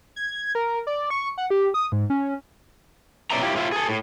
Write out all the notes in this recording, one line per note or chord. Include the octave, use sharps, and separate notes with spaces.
G#6
A#4
D5
C#6
F#5
G4
D#6
G#2
C#4
B2 C#4 D5 E5 A#5
E4 F4 G4
A2 F4 E5
G#4 A4
A2